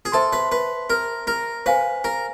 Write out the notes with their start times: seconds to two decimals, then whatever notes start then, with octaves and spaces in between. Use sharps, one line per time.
0.05 G#4
0.12 A4 C5 E5 A5 C6
0.33 B4
0.52 B4
0.90 A#4
1.27 A#4
1.66 B4 C5 F5 G#5
2.04 A#4